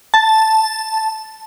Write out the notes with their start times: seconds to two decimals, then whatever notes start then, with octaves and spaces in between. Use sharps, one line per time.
0.14 A5